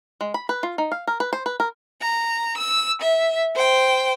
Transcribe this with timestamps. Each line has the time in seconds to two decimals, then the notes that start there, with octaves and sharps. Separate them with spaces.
0.21 G#3
0.34 B5
0.49 B4
0.63 F4
0.78 D#4
0.92 F5
1.07 A#4
1.20 B4
1.33 C5
1.46 B4
1.60 A#4
2.02 A#5
2.57 E6
3.02 E5
3.55 C5 G5